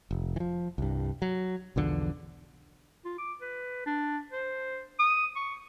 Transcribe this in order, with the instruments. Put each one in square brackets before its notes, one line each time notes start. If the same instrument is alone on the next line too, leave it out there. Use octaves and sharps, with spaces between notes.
[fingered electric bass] F1
E3 F3
C2 G2
F#3
B1 E2 D3 F3
[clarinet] F4
D6
B4
D4
C5
D#6
C#6